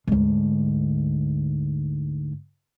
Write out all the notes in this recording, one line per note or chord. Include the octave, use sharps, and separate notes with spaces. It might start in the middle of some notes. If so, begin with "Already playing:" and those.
D2 G#2